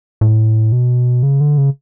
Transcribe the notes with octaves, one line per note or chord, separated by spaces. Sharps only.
A2
B2
C#3
D3
C#3